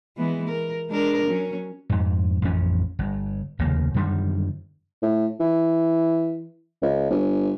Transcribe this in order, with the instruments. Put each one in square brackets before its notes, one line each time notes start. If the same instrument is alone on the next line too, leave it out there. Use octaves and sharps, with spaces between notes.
[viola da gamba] E3 G#3 B3
A#4
G#3 D4 A#4
F#3 C#4
[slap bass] F2 G#2
A1 F2 C#4
G1
F1 D#2 C#3 A#3
F#2 D3 D#3 G3
[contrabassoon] A2
E3
C#2
G1